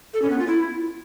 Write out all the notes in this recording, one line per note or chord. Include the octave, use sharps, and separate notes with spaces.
A4
C#4
B3
F4
E4